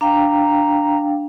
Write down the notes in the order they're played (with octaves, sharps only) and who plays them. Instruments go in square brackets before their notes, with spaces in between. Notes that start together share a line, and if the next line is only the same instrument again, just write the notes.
[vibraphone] D4 F5 G5 [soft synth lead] A#5